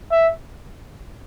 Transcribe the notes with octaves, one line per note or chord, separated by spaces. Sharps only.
E5